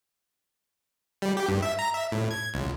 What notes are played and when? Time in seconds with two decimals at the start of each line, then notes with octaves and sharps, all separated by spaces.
1.22 G3
1.37 G4
1.48 G2
1.63 E5
1.79 A#5
1.94 E5
2.12 A2
2.31 G#6
2.54 C#2